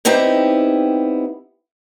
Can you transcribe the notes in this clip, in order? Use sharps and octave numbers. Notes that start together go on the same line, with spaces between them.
G3 B3 C4 D#4 E4 G4